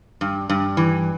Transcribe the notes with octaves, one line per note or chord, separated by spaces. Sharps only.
G2
G2
E3